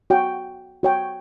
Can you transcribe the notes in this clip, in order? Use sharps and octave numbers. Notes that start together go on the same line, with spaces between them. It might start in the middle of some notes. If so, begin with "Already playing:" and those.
F#4 C#5 G5
F#4 C#5 G5